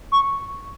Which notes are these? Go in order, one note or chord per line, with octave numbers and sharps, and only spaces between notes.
C#6